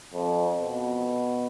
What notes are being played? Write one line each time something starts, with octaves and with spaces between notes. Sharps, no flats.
F2
B2